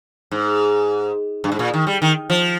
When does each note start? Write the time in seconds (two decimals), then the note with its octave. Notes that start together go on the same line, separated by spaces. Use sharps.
0.31 G#2
1.44 G2
1.52 G#2
1.59 A#2
1.74 D#3
1.87 G3
2.02 D#3
2.30 F3